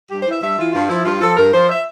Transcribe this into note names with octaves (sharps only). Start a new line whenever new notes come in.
G2 G4
C5
E3 E5
G2 E5
E3 F4
G2 F4
F3 E4
G2 F4
F3 A4
G2 A#4
F3 C5
E5